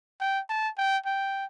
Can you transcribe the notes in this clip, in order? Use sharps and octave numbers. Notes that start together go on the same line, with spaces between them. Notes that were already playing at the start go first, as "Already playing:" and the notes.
G5
A5
G5
G5